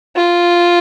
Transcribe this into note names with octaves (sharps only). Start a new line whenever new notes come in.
F4